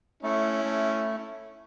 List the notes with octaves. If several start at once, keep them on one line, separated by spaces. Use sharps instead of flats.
A3 C#4 E4
A3